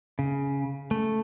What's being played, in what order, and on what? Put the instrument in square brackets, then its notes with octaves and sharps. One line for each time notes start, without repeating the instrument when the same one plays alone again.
[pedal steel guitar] C#3
A3